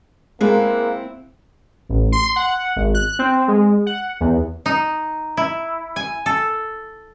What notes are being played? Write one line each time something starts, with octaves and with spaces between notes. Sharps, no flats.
G#3 A#3 C4 E4
A1
C6
F#5
G#1
F#6
C4
G#3
F#5
E2
D#4
E4
G#5
A4